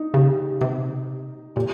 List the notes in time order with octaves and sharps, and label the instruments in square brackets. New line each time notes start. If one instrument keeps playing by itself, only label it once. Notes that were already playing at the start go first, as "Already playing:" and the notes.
Already playing: [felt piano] D#4
[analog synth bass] C#3 [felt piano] G4
[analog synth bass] C3
[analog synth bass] A#2 [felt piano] G4